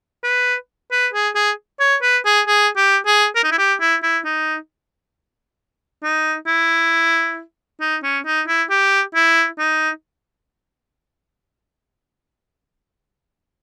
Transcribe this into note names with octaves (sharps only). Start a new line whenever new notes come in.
B4
B4
G#4
G#4
C#5
B4
G#4
G#4
G4
G#4
A#4
D#4
E4
G4
E4
E4
D#4
D#4
E4
D#4
C#4
D#4
E4
G4
E4
D#4